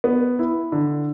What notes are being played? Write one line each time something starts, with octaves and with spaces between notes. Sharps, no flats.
B3
E4
D3